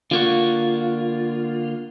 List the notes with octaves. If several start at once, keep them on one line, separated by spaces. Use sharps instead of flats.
D3 A#3 F4 F#4